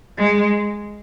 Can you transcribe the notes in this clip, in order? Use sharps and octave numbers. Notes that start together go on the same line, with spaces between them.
G#3